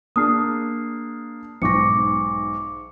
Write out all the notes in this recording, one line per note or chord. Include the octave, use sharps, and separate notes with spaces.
A#3 D4 G#4 D#6 F6 C7
B1 G#2 C#6 D6 A#6 C#7